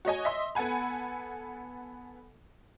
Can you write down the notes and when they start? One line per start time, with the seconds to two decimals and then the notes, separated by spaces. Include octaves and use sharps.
0.05 F#4 C#5 D#5 G#5
0.25 D#5 E5 C6
0.55 B3 A4 F#5 G#5 B5